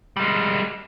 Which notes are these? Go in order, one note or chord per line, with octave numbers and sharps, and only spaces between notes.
G3 G#3